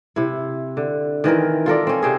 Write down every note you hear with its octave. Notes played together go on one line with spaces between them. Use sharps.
C3 E4
D3
D#3 E3 C4 A#4
F4 A4 A#4 D5
C4 C#4
C3 C4 G#4